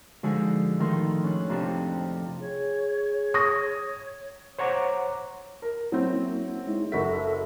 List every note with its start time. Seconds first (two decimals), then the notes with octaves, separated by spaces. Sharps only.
0.23 D3 F3 G#3 D#4 F#4 C5
0.80 A2 D#3 F3 D#4 C6
1.23 C#4 D4 F#6
1.49 F2 C3 F3 D4 D#4 D#6
2.41 G#4 C#5
3.34 C#6 D#6 A#6
4.59 C5 C#5 F#5 A#5 D6
5.62 A#4
5.92 F#3 A#3 C4 C#4 E4
6.67 G#3 D#4 E4
6.92 F#1 F#4 A4 E5 B6